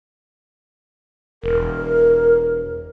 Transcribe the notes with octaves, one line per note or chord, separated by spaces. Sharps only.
E1 A#4